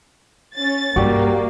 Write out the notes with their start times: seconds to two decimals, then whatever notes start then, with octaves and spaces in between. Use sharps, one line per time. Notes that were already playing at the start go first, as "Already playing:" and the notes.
0.55 C#4 A6
0.96 G2 A#3 F#4 G4 D5